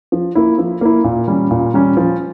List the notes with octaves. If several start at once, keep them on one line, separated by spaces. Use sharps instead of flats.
F3
A#3 E4
F3
A#3 E4
A#2
G3 C#4
A#2
G3 C#4
F3